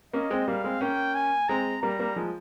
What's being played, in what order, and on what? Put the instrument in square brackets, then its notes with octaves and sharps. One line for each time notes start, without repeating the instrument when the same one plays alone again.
[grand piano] A#3 C#4 [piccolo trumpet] D#5
[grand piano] G#3 C4
[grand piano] G3 A#3 [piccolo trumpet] F5
[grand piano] G#3 C4
[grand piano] A#3 C#4 [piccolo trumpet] G5
[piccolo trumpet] G#5
[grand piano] G#3 C4 [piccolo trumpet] A#5
[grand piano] G3 A#3 [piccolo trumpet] A#5
[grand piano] G3 A#3
F3 G#3